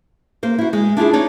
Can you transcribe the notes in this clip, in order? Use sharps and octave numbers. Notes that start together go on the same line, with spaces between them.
A#3 C5
E4 F#4
G#3
D4 E4 F4 G#4
D#4 C#5 D5